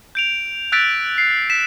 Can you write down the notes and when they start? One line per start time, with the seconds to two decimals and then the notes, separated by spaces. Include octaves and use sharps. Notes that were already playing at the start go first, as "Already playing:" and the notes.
0.15 G6 D7 F7
0.72 E6 F#6 G6 A6 B6 D7
1.18 C7
1.50 B6 E7